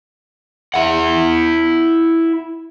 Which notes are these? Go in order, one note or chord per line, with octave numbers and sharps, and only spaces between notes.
E4 F#5